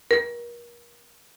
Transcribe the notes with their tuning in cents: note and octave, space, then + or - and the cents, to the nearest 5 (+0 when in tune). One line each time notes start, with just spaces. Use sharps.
A#4 +35